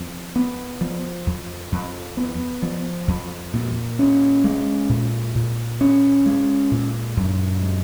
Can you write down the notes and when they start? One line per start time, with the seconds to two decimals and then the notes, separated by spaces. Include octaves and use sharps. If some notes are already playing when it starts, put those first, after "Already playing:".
Already playing: F2
0.36 B3
0.81 F3
1.27 F2
1.72 F2
2.17 B3
2.62 F3
3.08 F2
3.53 A#2
3.99 C#4
4.44 G#3
4.89 A#2
5.35 A#2
5.81 C#4
6.26 G#3
6.71 A#2
7.17 F#2
7.62 G#3